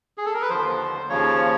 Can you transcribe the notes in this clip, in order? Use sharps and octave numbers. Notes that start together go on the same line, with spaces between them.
G#4
A4
A#4
B4
D#2 D3 F3 C5
D#2 C#3 F3 C#5